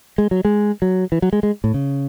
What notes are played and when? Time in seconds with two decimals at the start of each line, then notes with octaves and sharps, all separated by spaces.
0.18 G#3
0.31 F#3
0.45 G#3
0.82 F#3
1.12 E3
1.22 F#3
1.33 G#3
1.43 G#3
1.64 A2
1.74 C#3